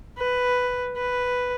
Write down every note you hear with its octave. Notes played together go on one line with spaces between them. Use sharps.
B4
B4